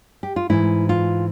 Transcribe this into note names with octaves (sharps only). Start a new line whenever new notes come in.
G4
F4
G#2 E3 E4
F4